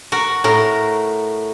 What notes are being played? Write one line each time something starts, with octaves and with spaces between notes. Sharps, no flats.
F#4 A#4
A2 A#4